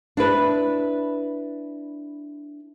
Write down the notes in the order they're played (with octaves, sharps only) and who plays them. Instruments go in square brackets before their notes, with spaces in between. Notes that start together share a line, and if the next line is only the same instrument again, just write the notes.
[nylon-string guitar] D4 E4 B4